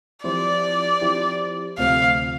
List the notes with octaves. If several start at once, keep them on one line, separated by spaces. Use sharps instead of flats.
F3 C4 E4 G4 C5 D5
F3 C4 E4 G4 C5
D2 C3 F3 A3 C4 F5